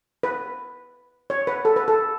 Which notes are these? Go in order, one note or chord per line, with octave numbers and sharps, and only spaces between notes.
B4
C#5
B4
A4
B4
A4